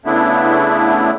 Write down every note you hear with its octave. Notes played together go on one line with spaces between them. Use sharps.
C#3 A3 B3 D4 E4